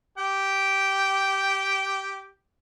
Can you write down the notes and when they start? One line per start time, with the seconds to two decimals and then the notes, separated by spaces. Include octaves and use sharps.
0.18 G4 G5